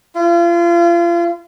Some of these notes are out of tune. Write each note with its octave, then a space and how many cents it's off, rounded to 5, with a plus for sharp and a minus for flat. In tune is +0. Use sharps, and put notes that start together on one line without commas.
F4 -35